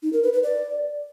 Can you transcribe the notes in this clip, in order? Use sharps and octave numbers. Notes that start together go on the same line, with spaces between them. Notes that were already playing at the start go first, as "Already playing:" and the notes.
D#4
A#4
B4
B4
D5